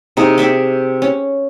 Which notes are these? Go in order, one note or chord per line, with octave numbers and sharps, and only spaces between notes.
C3 D#4 G#4
G#4 D5 E5 G5
C#4